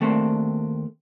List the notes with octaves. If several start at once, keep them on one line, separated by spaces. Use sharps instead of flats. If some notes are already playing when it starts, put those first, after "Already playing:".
D#2 A3 A#3 C4 D4